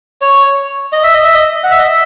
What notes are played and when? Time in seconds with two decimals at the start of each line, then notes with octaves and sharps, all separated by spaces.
0.22 C#5
0.92 D#5
1.03 E5
1.14 D#5
1.24 E5
1.34 D#5
1.64 F#5
1.71 E5
1.79 D#5
1.87 E5